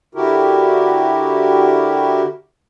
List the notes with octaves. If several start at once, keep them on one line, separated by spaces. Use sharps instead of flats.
D3 E4 F#4 G4 A#4